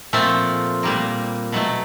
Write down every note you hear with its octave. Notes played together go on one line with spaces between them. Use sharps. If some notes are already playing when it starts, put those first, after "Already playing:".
A#2 F3 A3 C4 F4
A#2 G3 A#3
B2 F#3 A3